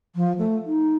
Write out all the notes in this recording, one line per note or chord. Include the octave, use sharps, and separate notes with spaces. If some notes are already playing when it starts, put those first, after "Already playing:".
F3
A3
D#4